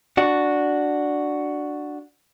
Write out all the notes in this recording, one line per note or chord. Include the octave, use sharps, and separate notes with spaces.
D4 F#4